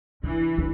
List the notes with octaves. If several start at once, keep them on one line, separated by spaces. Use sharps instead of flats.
D3 E3
D3